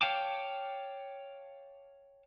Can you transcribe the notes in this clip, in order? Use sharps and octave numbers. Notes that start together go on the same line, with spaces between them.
C#5 F5 G5 A5 D6